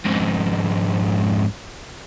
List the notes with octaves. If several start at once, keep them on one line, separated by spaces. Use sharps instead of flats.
F2 G#2